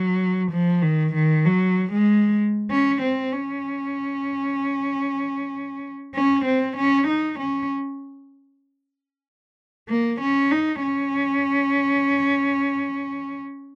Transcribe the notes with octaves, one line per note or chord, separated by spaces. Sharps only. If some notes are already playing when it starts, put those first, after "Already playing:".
Already playing: F#3
F3
D#3
D#3
F#3
G#3
C#4
C4
C#4
C#4
C4
C#4
D#4
C#4
A#3
C#4
D#4
C#4